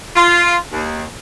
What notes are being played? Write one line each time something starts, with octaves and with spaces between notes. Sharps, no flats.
F4
D#2